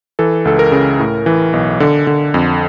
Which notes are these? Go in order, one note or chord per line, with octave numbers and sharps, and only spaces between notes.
E3 A4
C#2 A4
A#4
C#3
A2
E3
B1
D3
D3
F2